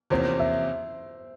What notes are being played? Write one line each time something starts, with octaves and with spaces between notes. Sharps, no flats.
E2 C3 F3 A#3 C#4 C5
E5